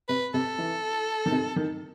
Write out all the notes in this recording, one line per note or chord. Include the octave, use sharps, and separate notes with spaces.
C3 B4
C3 A4
E3
D#3
C3
D#3